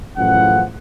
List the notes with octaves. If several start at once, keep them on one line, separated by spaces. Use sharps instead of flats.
F#2 A2 C#3 E3 F3 F#5